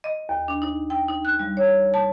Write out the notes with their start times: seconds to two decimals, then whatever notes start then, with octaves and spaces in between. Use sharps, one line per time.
0.04 D#5
0.29 D#2
0.48 D4
0.62 D#4
0.90 G5
1.08 D#4
1.25 F#6
1.39 G3
1.57 C#5
1.94 A5